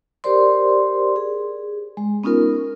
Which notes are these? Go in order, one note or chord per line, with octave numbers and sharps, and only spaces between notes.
G4 A#4 C5 D5 C6
G#4
G#3
B3 C#4 D#4 F4 A#4